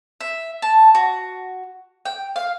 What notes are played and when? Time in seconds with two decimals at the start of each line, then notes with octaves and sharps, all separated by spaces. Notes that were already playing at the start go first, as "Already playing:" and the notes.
0.20 E5
0.62 A5
0.95 F#4
2.05 G5
2.36 F5